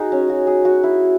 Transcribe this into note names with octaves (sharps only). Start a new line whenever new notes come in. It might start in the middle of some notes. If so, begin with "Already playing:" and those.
Already playing: D#4 F#4 G#4
C#4
F#4
G#4
F#4
E4